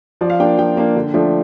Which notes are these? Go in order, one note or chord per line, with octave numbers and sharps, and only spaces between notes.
F3 D5
F5
A#3 D4 G5
F3 G5
A#3 D4
D3
F3 A3 D4